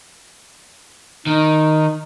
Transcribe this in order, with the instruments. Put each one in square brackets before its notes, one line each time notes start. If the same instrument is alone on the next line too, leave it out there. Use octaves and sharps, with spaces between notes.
[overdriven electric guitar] D#3 [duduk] D#4